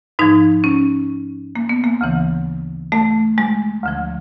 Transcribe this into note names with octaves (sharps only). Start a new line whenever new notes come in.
G#2 F3 D#4
C#4
A#3
B3
A#3
D2 C#3 E3
A3
G#3
D2 D3 F3